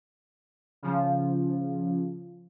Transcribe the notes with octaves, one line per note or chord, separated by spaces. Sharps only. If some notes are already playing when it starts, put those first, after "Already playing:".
C#3 F3